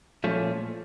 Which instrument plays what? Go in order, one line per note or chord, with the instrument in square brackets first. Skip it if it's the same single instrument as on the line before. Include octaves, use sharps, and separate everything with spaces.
[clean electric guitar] A#2 F3 A3 C#4